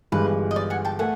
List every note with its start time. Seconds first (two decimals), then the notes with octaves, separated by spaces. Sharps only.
0.12 G1 G2 E3 G#3 B4
0.51 D#5
0.56 D5
0.70 F#5 G#5
0.85 G5 A5
0.99 A3 F#5 G#5